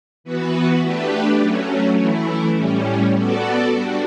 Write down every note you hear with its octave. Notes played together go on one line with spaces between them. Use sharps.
E3 B3 F#4 B4
A3 D4 G4 B4
F#3 A3 C#4
E3 A3 E4
A2 G3 C#4
B3 F#4 A4 D5
G3 D4 F#4